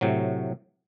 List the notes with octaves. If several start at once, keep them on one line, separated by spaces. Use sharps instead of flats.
A2 C3 F#3